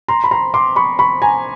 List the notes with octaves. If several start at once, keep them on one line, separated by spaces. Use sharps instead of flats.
A#5 C6
B5
A#5 C6
C6 D6
B5 C#6
B5 C#6
G#5 A#5